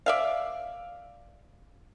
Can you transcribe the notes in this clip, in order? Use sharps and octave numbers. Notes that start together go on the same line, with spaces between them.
D5 E5 F5